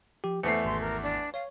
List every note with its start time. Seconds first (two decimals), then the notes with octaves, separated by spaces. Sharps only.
0.24 F3 G4
0.43 E2 A3 C5 C7 C#7
0.65 G#1 C6
0.81 A#4
1.02 D4
1.34 C#5 F5